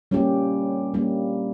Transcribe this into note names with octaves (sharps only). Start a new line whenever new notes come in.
G3 A#3 C#4 G4
G3 A#3 C#4 G4